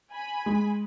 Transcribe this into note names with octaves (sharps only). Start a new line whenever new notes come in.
G#5 B5
G#3